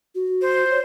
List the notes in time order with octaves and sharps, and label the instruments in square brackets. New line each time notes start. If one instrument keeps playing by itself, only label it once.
[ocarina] F#4
[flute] C5
[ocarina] C#5